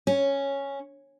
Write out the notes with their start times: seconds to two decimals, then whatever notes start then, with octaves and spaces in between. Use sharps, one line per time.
0.07 C#4